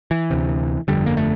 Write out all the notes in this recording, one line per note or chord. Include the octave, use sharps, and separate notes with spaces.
E3
D2 C3
G1 F2 D3 G3
A#3
A3